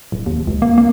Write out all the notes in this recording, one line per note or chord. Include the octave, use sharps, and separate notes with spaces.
D1
D#2
C#2
A#3
A#3